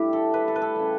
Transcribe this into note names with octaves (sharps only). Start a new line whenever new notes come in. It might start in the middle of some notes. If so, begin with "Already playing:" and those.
Already playing: A2 G3 D4 E4 G4
A4
B4
A4
B4
A4
C#3 G3